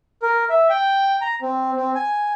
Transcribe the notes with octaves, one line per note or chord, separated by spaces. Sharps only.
A#4
E5
G5
A#5
C4
C4
G#5